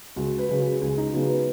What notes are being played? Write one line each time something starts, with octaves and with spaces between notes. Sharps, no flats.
C#2 F#4
B4
C#3 F#3
G#4
C#2 G#4
D#4
C#3 F#3 B3
B4